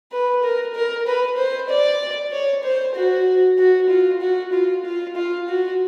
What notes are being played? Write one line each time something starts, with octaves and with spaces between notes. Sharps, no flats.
B4
A#4
A#4
B4
C5
D5
C#5
C5
F#4
F#4
F4
F#4
F4
F4
F4
F#4